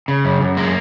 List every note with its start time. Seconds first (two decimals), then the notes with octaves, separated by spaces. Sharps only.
0.08 C#3
0.25 F#2
0.41 F#2
0.57 G#3 A#3